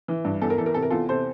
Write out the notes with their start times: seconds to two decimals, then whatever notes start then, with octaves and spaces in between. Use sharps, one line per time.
0.08 E3
0.25 G2
0.42 E2 A4
0.50 A#4
0.58 E3 A4
0.66 A#4
0.74 C3 A4
0.82 A#4
0.90 E2 F4 A4
1.09 C3 A4 C5